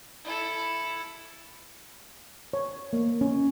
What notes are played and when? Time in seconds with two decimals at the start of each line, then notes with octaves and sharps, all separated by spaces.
0.25 E4 A4
2.53 C#5
2.93 A#3
3.21 C#4